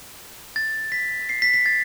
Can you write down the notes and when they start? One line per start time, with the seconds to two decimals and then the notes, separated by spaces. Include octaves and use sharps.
0.56 A6
0.92 B6
1.29 C7
1.42 B6
1.54 B6
1.66 A6